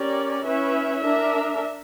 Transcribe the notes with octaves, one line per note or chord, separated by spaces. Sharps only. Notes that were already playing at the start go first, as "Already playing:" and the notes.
Already playing: C#4 G4 A#4 D5
C#4 E4 B4 E5
D4 A#4 E5